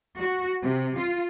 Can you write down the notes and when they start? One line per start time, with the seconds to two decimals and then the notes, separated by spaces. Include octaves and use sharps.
0.20 F#4
0.62 C3
0.96 F4